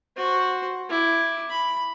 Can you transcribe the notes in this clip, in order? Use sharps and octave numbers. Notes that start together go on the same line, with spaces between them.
F#4 C5
E4 D6
B5